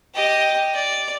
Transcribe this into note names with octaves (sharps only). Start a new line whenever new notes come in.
G4 D#5
D5